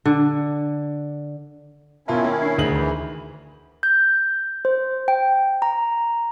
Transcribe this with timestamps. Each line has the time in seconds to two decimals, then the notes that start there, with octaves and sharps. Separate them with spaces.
0.06 D3
2.08 B2 D#3 C#4 E4 F4 A#4 E5 A5
2.24 A#3
2.42 D4 C7
2.58 D2 D#3 G#4 F#7
2.76 E3 B5
3.83 G6
4.65 C5
5.08 G5
5.62 A#5